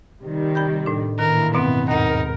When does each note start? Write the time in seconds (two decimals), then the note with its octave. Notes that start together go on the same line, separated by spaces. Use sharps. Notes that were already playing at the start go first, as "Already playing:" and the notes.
0.24 C3 D#3 G3
0.55 G5 B5 G6
0.86 A2 D4
1.19 A#2 D#3 E3 A#4
1.54 G2 B2 B3 C4
1.88 D#2 G#2 D#4 A#4 F#5